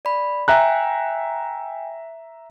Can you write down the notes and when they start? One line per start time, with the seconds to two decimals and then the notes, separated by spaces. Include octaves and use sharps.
0.05 D5 B5
0.48 E5 G5 G#5 A#5 F#6